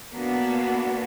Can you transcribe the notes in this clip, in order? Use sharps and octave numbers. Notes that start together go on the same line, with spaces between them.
A#3 B3 D4 F#4